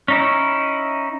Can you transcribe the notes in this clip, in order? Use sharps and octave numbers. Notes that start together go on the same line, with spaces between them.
C#4 D#4 E4